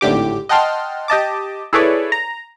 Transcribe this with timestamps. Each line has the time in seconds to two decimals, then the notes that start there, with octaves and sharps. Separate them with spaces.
0.01 G#1 A2 D3 G4 D6
0.49 D#5 F#5 G5 A5 C6 F6
1.08 G4 D#5 A5 D6
1.73 E4 G#4 A4 B4 C#5 D5
2.12 A#5